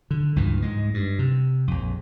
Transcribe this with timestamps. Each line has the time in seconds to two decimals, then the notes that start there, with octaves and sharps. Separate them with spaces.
0.11 D3
0.36 C#2 G2 A#2 E3
0.62 G#2 G#3
0.94 G2
1.19 C3
1.67 A#1 F2